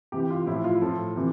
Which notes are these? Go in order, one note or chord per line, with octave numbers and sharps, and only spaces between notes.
C3 E3 G4
F4
A2 F3 E4
F4
A2 F3 A4
C3 E3